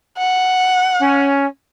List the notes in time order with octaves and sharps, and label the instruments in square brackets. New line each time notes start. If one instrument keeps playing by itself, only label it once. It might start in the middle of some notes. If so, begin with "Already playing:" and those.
[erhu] F#5
[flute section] C#4